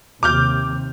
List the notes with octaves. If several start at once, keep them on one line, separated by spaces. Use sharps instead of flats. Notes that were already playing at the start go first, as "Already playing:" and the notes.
D#2 C3 D6 F6 G6